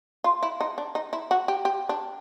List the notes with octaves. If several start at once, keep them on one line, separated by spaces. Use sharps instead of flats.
F4
E4
D#4
D4
D#4
E4
F#4
G4
G4
D4